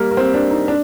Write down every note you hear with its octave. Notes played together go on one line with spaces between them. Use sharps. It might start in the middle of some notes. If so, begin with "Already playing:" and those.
Already playing: G3 A#3
A#3
C4
D4
D#4
D4